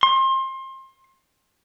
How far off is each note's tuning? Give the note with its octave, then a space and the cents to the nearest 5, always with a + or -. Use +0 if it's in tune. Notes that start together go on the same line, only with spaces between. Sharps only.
C6 +30